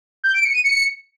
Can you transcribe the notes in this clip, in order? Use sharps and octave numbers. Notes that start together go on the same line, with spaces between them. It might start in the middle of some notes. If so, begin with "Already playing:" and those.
G6
D7
C#7
D#7
C#7